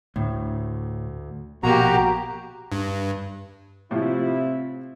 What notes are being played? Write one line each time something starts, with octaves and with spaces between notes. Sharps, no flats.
D2 A2
A#1 B2 A#3 F#4 G4 A#5
G2
A2 C3 F3 E4 F4